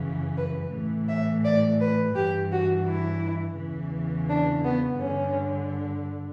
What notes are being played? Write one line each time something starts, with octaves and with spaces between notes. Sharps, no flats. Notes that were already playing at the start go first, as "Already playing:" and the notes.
Already playing: F#2 C#3 E3
B4
A2 E3
E5
D5
B4
G2 E3 G4
F#4
E4
E2 C#3 E3
D4
B3
G2 D3 C#4